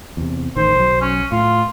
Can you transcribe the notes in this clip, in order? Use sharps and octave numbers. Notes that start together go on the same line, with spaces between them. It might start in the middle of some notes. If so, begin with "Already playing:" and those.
E2 C3
A1 D#3 C5
B1 F#3
C#4
A2 F4